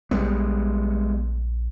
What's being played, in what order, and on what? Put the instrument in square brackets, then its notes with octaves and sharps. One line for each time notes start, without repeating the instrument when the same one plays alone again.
[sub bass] A#1 [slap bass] G3 G#3 B3